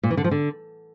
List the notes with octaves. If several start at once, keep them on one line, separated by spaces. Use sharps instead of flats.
A#2
E3
D3
F3
D3